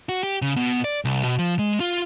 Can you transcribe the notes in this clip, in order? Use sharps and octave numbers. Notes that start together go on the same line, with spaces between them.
F#4
G4
C#3
B2
D5
C2
B2
F3
G#3
F4